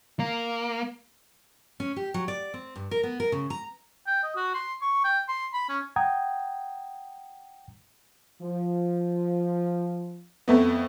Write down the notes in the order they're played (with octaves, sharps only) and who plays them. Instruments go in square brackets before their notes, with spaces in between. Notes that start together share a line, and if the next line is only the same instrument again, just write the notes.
[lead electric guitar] A#3
[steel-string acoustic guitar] C#4
G4
F#3
D5
C4
G2
A#4
B3
A#4
C#3
A#5
[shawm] G5
D#5
F#4
C6
C#6
G5
C6
B5
C#4
[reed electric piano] F#5 G5 A#5 D#6 G#6
[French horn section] F3
[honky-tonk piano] F2 A3 B3